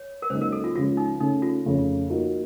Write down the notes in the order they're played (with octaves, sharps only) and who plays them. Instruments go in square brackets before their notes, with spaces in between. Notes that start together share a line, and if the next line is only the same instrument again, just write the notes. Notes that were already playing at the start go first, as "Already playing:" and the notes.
Already playing: [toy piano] C#5
A#4
[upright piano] C#2 C#3 F#3 A#3 D#4 [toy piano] C5
[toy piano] A#4
A4
F4
[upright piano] C#2 C#3 F3 [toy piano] F4
[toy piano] D#4
[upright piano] C#3 A3 C#4 [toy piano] D#4
[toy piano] F4
[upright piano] F2 C#3 F3 A3
F3 A#3 D#4 F#4 A#4